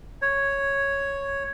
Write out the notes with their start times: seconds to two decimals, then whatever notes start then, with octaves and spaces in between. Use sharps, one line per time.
0.22 C#5